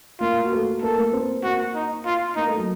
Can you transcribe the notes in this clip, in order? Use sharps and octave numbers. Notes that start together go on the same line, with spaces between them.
A#3 F4 A#4
F#4
A3 A4
A#3 A4 A#4
A#3 A#4
C4 C5
A#3 F#4 A#4
D#4
F4
A#3 D#4 A#4
A3 A4
F#3 F#4